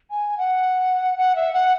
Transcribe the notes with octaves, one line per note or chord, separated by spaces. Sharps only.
G#5
F#5
F#5
E5
F#5